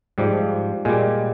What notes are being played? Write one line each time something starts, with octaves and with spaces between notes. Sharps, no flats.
G#2 F3 G3
A#2 G3 G#3